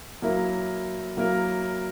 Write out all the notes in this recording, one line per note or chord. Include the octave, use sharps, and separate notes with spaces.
F#3 A#3 E4 A#4
F#3 A#3 E4 A#4